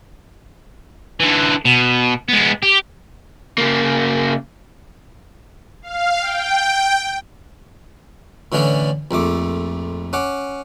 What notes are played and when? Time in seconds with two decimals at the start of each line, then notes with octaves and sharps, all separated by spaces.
1.20 D3 E3
1.65 B2
2.28 G#3 B3
2.63 G4
3.58 C#3 A#3
5.82 F5
6.21 G5
8.52 A2 D3 E3 C#4 D4
9.11 A#1 F2 A3 D6
10.13 C#4 F#5 D6